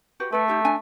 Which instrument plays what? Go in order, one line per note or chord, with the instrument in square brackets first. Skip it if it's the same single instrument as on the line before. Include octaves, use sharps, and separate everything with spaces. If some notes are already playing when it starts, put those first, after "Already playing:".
[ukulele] F#4 G4 B4
[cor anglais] A3 [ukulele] A4 B4
[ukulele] D#4 G4 A4
D4 G#5